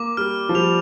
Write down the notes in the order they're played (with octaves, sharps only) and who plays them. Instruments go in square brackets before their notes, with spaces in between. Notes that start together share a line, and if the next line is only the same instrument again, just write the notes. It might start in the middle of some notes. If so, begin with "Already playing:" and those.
Already playing: [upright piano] A#3 [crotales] D6
[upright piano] G3 [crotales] F6
[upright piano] F3
[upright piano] G3 [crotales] F7